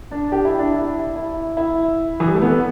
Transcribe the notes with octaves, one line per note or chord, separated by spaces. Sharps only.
D4
G4
E4
D4
E4
E4
E4
E3
G3
A3
B3